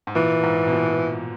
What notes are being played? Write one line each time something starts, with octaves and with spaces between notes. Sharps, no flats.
G#2
A#2 E3
G#2
B2
A#2